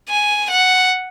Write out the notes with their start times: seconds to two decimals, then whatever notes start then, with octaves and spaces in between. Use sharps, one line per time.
0.09 G#5
0.50 F#5